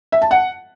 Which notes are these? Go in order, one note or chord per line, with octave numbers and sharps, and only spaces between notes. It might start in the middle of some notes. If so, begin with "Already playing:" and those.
E5
A5
F#5